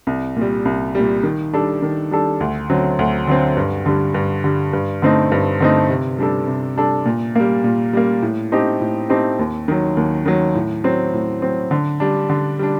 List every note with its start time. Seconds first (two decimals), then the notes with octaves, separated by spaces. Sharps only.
0.07 C2
0.36 A#2 G3
0.65 C2
0.95 A#2 G3
1.23 D#3
1.53 G3 D4 A4
1.82 D#3
2.11 G3 D4 A4
2.40 D2
2.70 D3 F#3 C4
2.99 D2
3.27 D3 F#3 C4
3.57 G2
3.86 D3 G3
4.14 G2
4.44 D3 G3
4.73 G2
5.02 D3 A3 C4 D#4
5.32 G2
5.60 D3 A3 C4 D#4
5.89 C3
6.18 G3 D4 A4
6.47 C3
6.76 G3 D4 A4
7.05 A#2
7.35 G3 A#3
7.64 A#2
7.93 G3 A#3
8.22 A2
8.52 A3 C4 D#4 G4
8.81 A2
9.09 A3 C4 D#4 G4
9.39 D#2
9.68 D#3 F#3
9.97 D#2
10.26 D#3 F#3
10.55 A2
10.84 F#3 C4
11.13 A2
11.42 F#3 C4
11.71 D3
12.00 G3 D4
12.29 D3
12.59 G3 D4